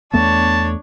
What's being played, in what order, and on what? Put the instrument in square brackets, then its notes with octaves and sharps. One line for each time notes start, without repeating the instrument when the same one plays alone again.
[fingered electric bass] E2 A3 B3 [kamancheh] D4 C#5 [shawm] A5